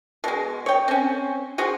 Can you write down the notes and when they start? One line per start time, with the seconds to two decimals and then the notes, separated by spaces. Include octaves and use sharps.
0.24 B2 G#3
0.66 C#5 G5
0.88 C4 C#4
1.58 F#4 G#4 C5